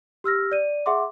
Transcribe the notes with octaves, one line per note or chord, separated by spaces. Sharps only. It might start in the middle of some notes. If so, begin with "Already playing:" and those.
G4 E6 F6 A#6
D5 D#7
G#4 E5 F#5 C6 D6